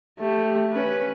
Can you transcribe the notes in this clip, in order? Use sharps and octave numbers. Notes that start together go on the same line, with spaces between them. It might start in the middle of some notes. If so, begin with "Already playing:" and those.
A3 G4
C#4 B4